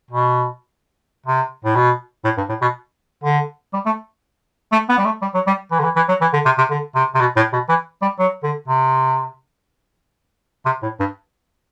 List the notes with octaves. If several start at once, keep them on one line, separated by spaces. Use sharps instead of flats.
B2
C3
A2
B2
A2
G2
A2
B2
D3
G3
A3
A3
B3
G3
A3
G3
F#3
G3
E3
D3
E3
E3
F#3
E3
D3
C3
C3
D3
C3
C3
B2
A2
B2
E3
G3
F#3
D3
C3
C3
A2
G2